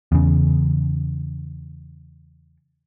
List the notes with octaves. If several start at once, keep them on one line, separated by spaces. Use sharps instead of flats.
E2 C#3